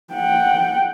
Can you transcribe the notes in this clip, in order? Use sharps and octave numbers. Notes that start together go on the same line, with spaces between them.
F#5 G5